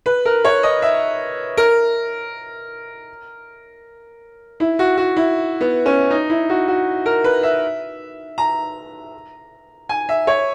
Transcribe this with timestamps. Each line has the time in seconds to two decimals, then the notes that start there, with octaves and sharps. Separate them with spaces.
0.06 B4
0.25 A#4
0.44 C#5
0.63 D#5
0.82 E5
1.57 A#4
4.60 E4
4.79 F#4
4.97 F#4
5.16 E4
5.61 B3
5.86 C#4
6.11 D#4
6.30 E4
6.50 F#4
6.68 F#4
7.06 A#4
7.24 B4
7.43 E5
8.38 A#5
9.89 G#5
10.09 E5
10.27 C#5